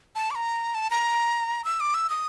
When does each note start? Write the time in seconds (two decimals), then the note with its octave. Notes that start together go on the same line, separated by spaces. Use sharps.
0.15 A5
0.31 D6
0.35 A#5
0.75 A5
0.91 A#5
1.65 E6
1.80 D6
1.94 E6
2.10 D#6